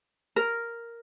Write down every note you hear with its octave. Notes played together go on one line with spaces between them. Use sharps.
A#4